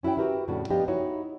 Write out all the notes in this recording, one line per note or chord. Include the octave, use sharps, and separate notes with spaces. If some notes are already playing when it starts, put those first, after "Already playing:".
C#4 E4 F#4 C#5 G5
F#4 G4 A#4 B4 E5
F2 A2 C#3 D4 F#4
F3 B3 D4 G4 D#5 F5
D#4 E4 F#4 C#5